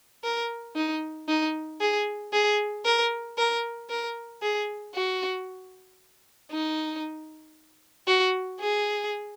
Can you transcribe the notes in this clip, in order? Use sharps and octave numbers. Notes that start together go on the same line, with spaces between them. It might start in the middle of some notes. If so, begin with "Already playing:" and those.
A#4
D#4
D#4
G#4
G#4
A#4
A#4
A#4
G#4
F#4
D#4
F#4
G#4